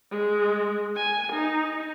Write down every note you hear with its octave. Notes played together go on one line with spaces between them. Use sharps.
G#3
G#5
D#4